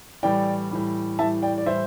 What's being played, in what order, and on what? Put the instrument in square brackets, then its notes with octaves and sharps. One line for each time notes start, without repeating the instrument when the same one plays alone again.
[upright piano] A2 E3 G3 D5 G5
A2 E3 G3
A2 E3 G3 E5 A5
D5 G5
D5
A2 E3 G3 C5 E5